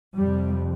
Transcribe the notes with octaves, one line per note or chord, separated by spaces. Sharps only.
F2 C3 G3